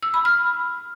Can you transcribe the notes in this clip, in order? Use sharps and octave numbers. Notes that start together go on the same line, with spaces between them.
E6
B5
F6